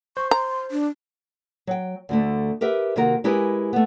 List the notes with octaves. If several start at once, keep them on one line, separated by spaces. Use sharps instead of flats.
C5 C#6
A#5 C6
D4
F#3 G5
D2 D3 A3
G4 A#4 B4 E5
C3 D#3 A#3 F#4 A#4
G#3 E4 G4 A#4 B4 G#5
A3 B3